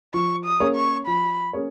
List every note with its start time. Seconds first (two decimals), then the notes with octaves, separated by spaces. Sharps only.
0.14 F3 C#6
0.45 D#6
0.60 A#3 C#4 G#4 C#5
0.75 C#6
1.06 F3 B5
1.53 A#3 C#4 G#4 C#5